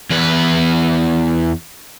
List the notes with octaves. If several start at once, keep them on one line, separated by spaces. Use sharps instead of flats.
E2 B4